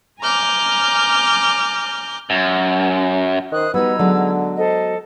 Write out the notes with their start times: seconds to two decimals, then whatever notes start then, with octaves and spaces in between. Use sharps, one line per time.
0.21 G#5 A#5 D6 F6 G6
2.30 F#2
3.52 D#3 C5 D#6 F#6
3.74 G3 B3 D#4 F#4 B4 E6 G#6
3.99 D3 F#3 G#3 B3
4.57 A4 C5 D#5